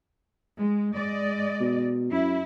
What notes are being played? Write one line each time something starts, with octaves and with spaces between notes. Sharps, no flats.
G#3
G#3 D5 D#5
B2
F#2 E4